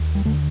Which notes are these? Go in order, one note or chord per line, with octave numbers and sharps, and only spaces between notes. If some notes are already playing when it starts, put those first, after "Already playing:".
Already playing: D#2
G3
D3 A3